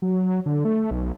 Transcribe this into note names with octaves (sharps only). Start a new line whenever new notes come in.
F#3
D3
A3
B1